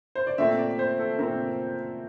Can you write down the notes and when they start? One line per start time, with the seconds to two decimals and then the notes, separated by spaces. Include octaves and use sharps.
0.15 C5
0.27 D5
0.38 A#2 A3 C4 E5
0.58 D5
0.79 C5
0.99 A4
1.18 A#2 A3 C4 A#4